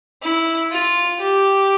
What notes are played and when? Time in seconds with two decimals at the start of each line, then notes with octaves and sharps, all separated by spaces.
0.22 E4
0.71 F4
1.19 G4